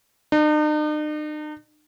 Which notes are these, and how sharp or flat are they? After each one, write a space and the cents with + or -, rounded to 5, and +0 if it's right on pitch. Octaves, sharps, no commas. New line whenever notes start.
D#4 -45